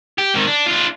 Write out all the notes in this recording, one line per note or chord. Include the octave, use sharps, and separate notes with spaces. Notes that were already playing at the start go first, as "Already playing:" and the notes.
G4
G#2 D#3
D4
D4 F4